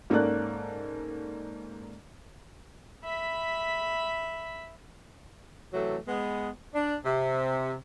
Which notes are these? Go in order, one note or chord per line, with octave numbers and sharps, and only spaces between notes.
G#2 A#3 C#4 A4 D5 F#6
E5 B5
C3 E3 F#3 A3
G#3 B3
D4
C3